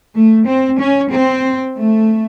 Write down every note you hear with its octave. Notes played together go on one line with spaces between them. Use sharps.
A3
C4
C#4
C4
A3